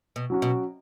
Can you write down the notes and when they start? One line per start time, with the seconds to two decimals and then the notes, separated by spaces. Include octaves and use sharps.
0.16 B2
0.30 F#3 C#4 F#4
0.42 B2